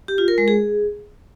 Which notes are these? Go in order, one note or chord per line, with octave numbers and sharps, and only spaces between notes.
G4
F4
A#4
G#3
G#4